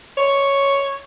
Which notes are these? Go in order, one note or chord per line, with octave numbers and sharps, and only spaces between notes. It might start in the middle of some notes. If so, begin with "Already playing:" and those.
C#5